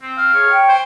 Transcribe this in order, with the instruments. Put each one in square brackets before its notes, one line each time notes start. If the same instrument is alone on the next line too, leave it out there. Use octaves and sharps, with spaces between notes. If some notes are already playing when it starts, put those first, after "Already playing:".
[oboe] C4
[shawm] F5
[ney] G#4 [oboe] C#5
[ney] G5
[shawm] C5